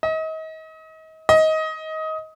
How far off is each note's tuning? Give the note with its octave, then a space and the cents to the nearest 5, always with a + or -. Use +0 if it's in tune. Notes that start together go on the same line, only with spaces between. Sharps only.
D#5 +35
D#5 +20